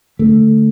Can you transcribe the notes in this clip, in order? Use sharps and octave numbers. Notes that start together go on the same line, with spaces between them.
D3 A3